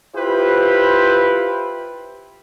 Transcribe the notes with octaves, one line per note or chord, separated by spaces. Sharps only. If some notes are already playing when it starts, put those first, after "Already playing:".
E4 F4 G4 B4 C5